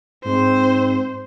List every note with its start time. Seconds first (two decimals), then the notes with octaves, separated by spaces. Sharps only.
0.25 G#2 C4 C5